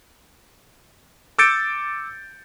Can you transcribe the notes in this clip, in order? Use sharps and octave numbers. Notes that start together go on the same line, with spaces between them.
D6 E6 G6 A6 C#7 D7